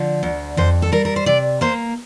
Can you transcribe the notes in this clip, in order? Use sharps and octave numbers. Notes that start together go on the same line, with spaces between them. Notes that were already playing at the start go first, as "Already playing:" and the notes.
Already playing: D3 F3
D2
F2 C5
A4
G3 A#4
A#4
C5
C3 D5
A#3 C5